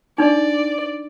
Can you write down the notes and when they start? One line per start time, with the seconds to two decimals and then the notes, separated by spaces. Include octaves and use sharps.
0.18 D4 D#4 D5